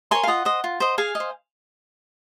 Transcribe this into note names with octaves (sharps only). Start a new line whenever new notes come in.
A#4 C#5 G#5 C6
F5
F4 D#5 F#5
C5 D#5
F4
C5 D#5
G#4 F5 G#5
D#5
C5